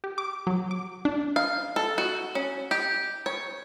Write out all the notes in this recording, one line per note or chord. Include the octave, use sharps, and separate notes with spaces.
G4
D6
F#3
D6
D4
F5
A4
F#4
C#4
G4
C#5